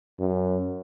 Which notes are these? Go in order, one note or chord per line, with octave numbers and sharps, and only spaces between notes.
F#2